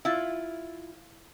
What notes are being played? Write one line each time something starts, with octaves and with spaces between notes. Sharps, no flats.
E4 F4